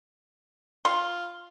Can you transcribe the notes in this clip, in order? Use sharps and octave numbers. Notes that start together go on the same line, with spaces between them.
F4 C6